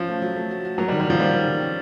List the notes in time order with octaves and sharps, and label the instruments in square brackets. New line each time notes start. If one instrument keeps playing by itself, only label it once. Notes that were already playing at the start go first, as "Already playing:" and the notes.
Already playing: [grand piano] F3 [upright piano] C#4
[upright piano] A3
F#3
A3
F#4
F#4
[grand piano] F#3 [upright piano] A#3
[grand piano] G3
[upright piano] D#3
[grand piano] G3
[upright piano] D#3 [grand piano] F3
[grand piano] G3 [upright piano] A#3
[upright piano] D#3
D#3
C#4